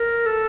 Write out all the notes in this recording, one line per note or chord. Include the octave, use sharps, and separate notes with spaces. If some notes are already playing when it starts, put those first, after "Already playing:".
Already playing: A#4
A4